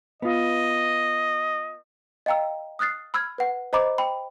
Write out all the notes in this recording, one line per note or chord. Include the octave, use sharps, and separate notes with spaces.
B3 F4 D#5
D#5 F5 G5 A#5 E6
D#6 F6 F#6 A6 C7
B5 E6 F6 G#6
B4 F#5
C5 D#5 A#5 B5 D6
G5 B5